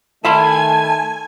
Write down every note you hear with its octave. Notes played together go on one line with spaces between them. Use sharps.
D#3 A3 E5 G#5 A5 B5 C6 G#6